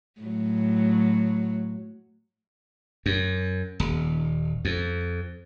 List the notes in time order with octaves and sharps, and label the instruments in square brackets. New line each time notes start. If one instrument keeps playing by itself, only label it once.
[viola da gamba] A2 F#3
[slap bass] F#2
D#1
F2